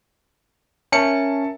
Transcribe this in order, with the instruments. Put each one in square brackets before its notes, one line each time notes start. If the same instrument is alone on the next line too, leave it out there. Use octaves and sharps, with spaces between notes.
[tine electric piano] C#4 C#7 [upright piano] A#4 E5 A5